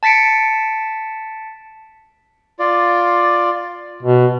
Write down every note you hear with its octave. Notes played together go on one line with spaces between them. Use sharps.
A5 A6 B6 C#7 D7
F4 D5
B2